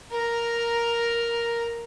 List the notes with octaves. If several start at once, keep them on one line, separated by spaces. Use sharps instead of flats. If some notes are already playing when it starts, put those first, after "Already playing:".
A#4 A#5